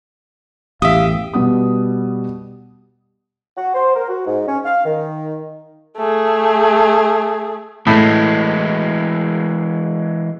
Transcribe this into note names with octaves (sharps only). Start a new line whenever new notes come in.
A1 E2 G4 E5 F5 D#6
B2 G3 B3 D#6
F#4
C5
A#4
F#4
G#2
C#4
F5
D#3
A3 G#4
A2 E3 G#3